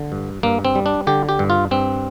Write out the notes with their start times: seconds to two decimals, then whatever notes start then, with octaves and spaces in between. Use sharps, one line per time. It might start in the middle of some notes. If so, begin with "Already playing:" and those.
Already playing: D3
0.12 G2
0.43 G2 A#3
0.65 C4
0.75 G3
0.86 D4
1.07 D3 G4
1.29 G4
1.39 G2
1.50 F4
1.71 G2 C4